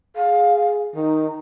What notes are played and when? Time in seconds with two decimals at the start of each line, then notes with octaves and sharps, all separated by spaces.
0.16 G#4 F5
0.95 D#3 D#4